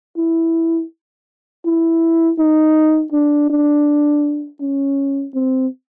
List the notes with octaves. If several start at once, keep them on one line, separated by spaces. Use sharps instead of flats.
E4
E4
D#4
D4
D4
C#4
C4